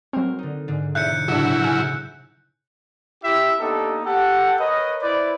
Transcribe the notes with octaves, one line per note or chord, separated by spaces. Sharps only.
F#3 C4 A#4
D3 D#4
G#2 D3
E1 D#4 E5 F#6 G6 C#7
A2 C#3 F#3 D4 E4 F#4
G#5 F6
E4 G4 E5
A#3 B3 D4 D#4 G4 A4
G4 A4 F#5
A#4 B4 C#5 D#5
E4 B4 C5 D5